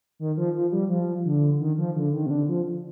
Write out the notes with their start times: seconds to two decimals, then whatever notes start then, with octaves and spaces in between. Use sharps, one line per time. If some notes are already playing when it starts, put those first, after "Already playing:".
0.19 D#3
0.37 F3
0.54 F3
0.72 G3
0.89 F3
1.25 D3
1.60 D#3
1.78 F3
1.96 D3
2.13 D#3
2.26 C3
2.31 D3
2.49 F3